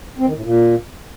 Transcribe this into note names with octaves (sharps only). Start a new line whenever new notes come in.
C4
D#3
A2
A#2